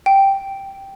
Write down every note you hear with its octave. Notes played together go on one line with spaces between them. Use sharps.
G5